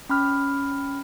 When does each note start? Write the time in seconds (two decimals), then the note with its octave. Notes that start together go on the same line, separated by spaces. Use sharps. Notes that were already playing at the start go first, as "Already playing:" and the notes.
0.09 C#4 B5 F6